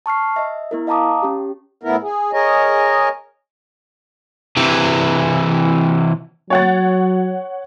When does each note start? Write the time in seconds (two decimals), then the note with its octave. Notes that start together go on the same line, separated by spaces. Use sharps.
0.06 A5 C#6 F6 C7
0.36 D#5 E5
0.71 B3 E4 A#4
0.87 D#5 F5 A5 A#5 D6 D#6
1.23 C#4 G4
1.83 A2 B3 E4 A#4
2.03 G#4
2.33 G#4 A#4 C#5 D#5
4.56 C3 E3
6.50 F#3 C#5 F#5 A6